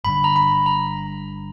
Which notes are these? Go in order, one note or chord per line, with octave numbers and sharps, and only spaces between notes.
G1 G2 D3 B5
A#5
B5
A#5